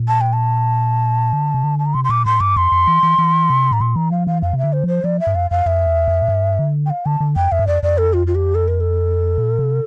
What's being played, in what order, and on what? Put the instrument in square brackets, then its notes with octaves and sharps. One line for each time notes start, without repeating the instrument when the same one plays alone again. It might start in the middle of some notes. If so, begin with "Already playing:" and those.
Already playing: [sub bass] A#2
[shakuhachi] A5
G5
A5
[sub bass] D3
C3
D3
[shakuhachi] A5
A#5
[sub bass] C3 [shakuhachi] C6
[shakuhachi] C6
[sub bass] A#2 [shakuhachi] D6
[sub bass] A2 [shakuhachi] C6
[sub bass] G2 [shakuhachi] D6
[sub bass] F2 [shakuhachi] C6
[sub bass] F2
E3
E3
E3
C3
[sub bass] A2 [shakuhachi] A#5
[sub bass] A#2 [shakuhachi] C6
[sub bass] E3 [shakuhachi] A#5
[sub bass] F3 [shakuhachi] F5
[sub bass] E3 [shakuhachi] F5
[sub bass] F2 [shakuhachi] F5
[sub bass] C3 [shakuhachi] E5
[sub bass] D3
[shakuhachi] C5
[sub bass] F3 [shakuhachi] C5
[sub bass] F3 [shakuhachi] D5
[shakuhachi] E5
[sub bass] G2
[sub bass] F2 [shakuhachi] F5
[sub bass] F2 [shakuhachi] F5
[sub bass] F2 [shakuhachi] E5
[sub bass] E2
F2
A2
G2
D3
[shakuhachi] G5
F5
[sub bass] D3 [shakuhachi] A5
[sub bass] D3
[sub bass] F2 [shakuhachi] G5
[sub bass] F2 [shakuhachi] E5
[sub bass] G2
[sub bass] F2 [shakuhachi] D5
[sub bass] F2 [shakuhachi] D5
[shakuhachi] A4
F4
F4
G4
A4
A#4
A4
[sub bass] A#2
C3